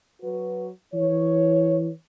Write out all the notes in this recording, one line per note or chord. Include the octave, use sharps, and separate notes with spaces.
F#3 F#4 B4
E3 C#5